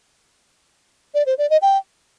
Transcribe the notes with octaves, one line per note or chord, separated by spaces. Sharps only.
D5
C5
D5
D#5
G5